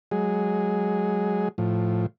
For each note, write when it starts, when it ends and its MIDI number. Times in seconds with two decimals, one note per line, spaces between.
0.11 1.48 54
0.11 1.48 56
0.11 1.48 68
1.58 2.06 45
1.58 2.06 53